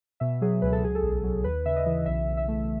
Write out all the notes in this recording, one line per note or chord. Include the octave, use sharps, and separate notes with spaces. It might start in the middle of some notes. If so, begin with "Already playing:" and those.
B2 E5
F#3 G#4
C#2 B4
A4
F#3 G#4
A4
B1
F#3
D#2 B4
C#3 E5
D#5
E3
B1 E5
B1
E5
A3